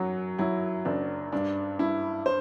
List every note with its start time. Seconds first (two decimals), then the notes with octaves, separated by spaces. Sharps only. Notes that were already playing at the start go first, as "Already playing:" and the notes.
Already playing: F#2 F#3 F#4
0.38 F#3 E4
0.85 F#1 D4
1.32 G2 D4
1.79 G2 E4
2.26 C5